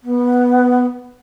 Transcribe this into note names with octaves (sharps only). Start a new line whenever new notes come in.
B3